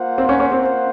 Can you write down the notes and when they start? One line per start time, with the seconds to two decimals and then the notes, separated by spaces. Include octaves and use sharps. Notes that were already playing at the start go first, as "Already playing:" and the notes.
Already playing: A#3 F4 C5 F#5
0.18 C4
0.29 C#4
0.40 C#4
0.52 C4